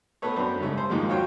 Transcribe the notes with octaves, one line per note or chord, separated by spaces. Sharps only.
A2 B3 A4 B4 C#5
F#2 C4 D4 B4
G#2 C#3 G3 A3
C5
F2 G#2 D#3 F3 G#3 A#3
F4 F#4 C#5 F5 G5